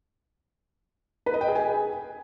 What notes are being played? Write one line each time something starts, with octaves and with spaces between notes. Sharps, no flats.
B4
D#5
G5
G#4
G#5